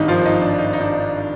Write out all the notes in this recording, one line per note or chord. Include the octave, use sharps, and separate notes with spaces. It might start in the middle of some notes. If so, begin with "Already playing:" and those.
Already playing: G#1 G2 D#3 D#4
F3 F4
D#4
D4
D#4
D#4
D4